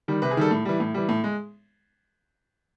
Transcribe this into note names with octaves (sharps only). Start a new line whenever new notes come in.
D#3 G3
C3 B4
G#4
D#3 G3 A4
A2
E3 G3
A2
E3 G3
A2
G#3